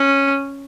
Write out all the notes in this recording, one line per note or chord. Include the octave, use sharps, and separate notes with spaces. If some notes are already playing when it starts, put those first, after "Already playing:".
Already playing: C#4